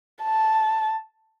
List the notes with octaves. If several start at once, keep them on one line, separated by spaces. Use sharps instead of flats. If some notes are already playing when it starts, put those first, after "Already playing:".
A5